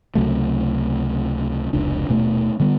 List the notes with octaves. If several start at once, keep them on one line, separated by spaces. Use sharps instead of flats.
C#2 C3 F#3 A3
F1 C#2 D4
D#1 B2 A3
D3 G3 B3